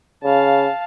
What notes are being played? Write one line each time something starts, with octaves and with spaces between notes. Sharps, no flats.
C#3 F5 A5